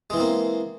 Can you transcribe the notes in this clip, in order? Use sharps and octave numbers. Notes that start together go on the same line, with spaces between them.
E3 G#3 A#3 C4